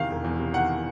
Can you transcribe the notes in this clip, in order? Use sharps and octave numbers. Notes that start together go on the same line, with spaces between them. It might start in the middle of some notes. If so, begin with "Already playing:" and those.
Already playing: E2 C3 D#3 F5
E1
E2
C3
D#3 F#5